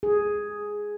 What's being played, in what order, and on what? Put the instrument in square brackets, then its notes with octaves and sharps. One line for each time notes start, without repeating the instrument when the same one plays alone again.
[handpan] G#4